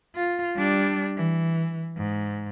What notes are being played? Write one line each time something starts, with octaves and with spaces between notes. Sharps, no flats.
F4
G3 D4
E3
G#2